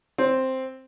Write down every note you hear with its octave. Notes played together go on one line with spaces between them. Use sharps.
C4